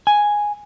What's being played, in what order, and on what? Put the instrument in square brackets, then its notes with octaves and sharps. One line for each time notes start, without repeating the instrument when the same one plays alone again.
[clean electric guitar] G#5